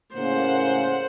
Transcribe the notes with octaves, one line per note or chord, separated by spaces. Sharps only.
A2 C#3 A#3 C5 F#5